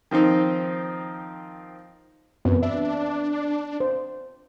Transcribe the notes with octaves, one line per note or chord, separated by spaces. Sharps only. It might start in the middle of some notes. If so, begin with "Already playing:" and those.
D#3 F3 C4 D#4
F#2 B3 C4 F#4
D4 E5
C5